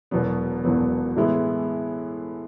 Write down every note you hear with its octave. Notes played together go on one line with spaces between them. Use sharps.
E1 E2 B2 F#3 B3
E1 E2 B2 F#3 B3
A2 E3 G#3 B3 E4